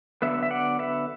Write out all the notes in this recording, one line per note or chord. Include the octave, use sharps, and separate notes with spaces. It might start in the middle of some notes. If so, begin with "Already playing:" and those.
D3 F#3 B3 B4 E5
E5
D5 F#5
B4 E5